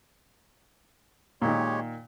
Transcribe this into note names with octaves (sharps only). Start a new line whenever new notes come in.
A#2 D#3 G#3 G4 C#5